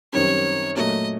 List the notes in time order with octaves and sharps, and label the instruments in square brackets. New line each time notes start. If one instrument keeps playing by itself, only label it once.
[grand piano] F#2 D#3 G3 C4 [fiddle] C#5
[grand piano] A#2 F#3 A3 [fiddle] D#5